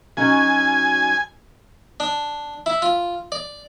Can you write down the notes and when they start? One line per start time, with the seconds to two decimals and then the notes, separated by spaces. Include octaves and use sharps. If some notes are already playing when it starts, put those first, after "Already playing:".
0.17 F#3 C#4 D#4 G#5
2.00 D4
2.66 E4
2.82 F4
3.32 D5